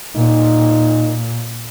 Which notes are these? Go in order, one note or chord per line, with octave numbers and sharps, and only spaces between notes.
A#2 D#4